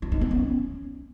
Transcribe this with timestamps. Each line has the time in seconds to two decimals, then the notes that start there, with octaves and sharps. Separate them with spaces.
0.02 E4
0.12 D#4
0.21 B3
0.31 C#4